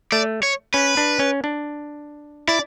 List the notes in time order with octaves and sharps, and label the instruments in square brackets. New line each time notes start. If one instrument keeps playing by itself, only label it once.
[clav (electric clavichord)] A3 [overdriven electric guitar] D5
[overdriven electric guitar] C#5
[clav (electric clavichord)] C#4 [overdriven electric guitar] B4
[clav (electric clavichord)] D4
C#4
D4
[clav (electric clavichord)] E4 [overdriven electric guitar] D5